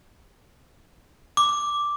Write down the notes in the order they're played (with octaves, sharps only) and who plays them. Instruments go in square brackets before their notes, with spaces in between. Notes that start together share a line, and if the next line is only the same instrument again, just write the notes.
[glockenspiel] D6